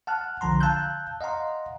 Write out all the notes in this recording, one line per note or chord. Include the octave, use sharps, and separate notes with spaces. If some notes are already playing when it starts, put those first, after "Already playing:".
F#5 A5 F6 F#6
B1 D3 F3 A#5 C6
F5 A5 E6 F#6 G6
D#5 F5 F#5 A#5 C6